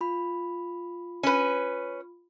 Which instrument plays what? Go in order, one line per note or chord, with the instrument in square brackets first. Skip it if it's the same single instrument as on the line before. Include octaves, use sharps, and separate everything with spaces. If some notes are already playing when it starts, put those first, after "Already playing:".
[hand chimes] F4 B5
[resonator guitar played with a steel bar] C#4 B4